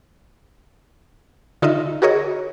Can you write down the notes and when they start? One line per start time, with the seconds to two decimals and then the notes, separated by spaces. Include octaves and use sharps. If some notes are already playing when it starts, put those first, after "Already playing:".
1.62 D3 D#4 F4 D#5 E5
2.02 F#4 G#4 A#4 C#5 D#5